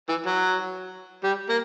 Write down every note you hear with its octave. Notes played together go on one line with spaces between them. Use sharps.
E3
F#3
G3
A#3